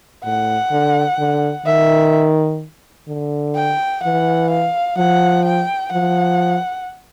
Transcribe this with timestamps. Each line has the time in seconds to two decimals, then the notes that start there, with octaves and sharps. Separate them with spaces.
0.24 A2 F#5
0.71 D3
1.19 D3
1.66 D#3 E5
3.08 D3
3.55 G5
4.03 E3 F#5
4.50 F5
4.97 F3 F#5
5.44 G5
5.92 F3 F#5